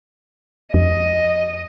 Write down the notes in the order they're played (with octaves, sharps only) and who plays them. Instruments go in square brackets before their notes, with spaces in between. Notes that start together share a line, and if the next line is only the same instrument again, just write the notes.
[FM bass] F2 [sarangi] D#5